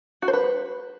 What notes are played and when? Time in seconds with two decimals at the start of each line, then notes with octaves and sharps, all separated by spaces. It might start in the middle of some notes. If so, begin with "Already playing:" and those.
0.22 F#4
0.28 C5
0.33 B4